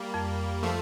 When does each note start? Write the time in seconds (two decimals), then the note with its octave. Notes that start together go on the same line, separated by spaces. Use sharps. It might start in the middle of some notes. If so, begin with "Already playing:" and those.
Already playing: G3 A#3
0.14 F2
0.63 F3 A3